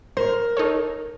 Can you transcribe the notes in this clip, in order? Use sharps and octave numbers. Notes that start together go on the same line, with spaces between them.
A#4 C5
D#4 A4 C#5